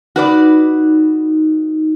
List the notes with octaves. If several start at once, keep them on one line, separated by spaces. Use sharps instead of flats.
D#4 F#4 B4 D5